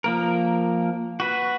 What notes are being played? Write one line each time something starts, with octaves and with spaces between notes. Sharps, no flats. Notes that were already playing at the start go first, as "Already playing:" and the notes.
F3 A#3 A#4
F#4 B4